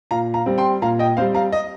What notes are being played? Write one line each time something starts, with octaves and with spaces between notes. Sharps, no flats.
A#2 F5 A#5
F5 A#5
G3 C4
G5 C6
A#2 F5 A#5
D#5 G5
G3 C4 C5 F5
F5 A#5
D#5